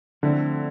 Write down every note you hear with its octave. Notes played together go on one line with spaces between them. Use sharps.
D3 F3 A3 C4 E4